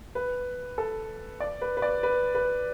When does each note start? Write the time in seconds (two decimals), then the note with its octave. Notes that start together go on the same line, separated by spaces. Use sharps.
0.15 B4
0.78 A4
1.40 D5
1.62 B4
1.77 B4
1.82 D5
2.03 B4
2.35 B4